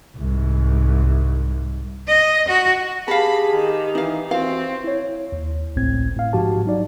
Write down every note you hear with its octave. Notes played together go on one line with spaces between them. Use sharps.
C2 G#2
D#5
F#4
G4 G#4 F5 A5 B5
D#3
E3 D#4 F5
E3 C4 F#4 F5
E4 C#5
D#2
G#1 C#2 A2 C4 G#6
A2 F5
G#2 F3 F#4 G4 A5
F#3 D#4 D5